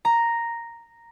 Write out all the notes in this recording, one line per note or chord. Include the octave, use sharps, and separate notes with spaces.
A#5